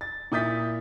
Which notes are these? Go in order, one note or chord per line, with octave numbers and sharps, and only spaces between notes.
A6
A#2 E4 D#6 G6 A6 B6